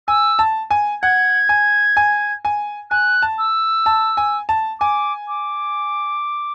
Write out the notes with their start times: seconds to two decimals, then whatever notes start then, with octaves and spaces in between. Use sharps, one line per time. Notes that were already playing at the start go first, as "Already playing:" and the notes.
0.08 G#5 E6
0.39 A5
0.71 G#5
1.02 F#5 G#6
1.49 G#5
1.97 G#5
2.45 G#5
2.91 G#5 F#6
3.22 A5
3.38 E6
3.86 A5
4.17 G#5
4.49 A5
4.80 G#5 D6
5.28 D6